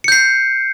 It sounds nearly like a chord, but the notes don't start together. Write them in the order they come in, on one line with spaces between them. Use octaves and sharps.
C#7 G6 C7